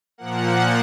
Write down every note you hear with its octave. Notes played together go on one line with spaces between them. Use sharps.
A#2 F3 A#3 F#5